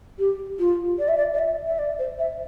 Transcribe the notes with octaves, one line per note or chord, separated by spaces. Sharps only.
G4
F4
D5
E5
D5
D5
E5
E5
D5
C5
E5